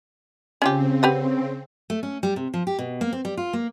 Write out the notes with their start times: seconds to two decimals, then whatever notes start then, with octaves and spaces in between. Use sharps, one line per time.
0.62 C#3 C4 C#4 F4 G4
1.03 G4 B4 F#5
1.90 A3
2.03 C#4
2.23 G3
2.36 C3
2.54 F3
2.67 G4
2.79 B2
3.01 A#3
3.12 C4
3.25 G3
3.37 F4
3.53 A#3